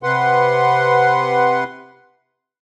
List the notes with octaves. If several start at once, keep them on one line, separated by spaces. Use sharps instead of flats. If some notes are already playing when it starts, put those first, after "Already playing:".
C3 B4 F#5 C6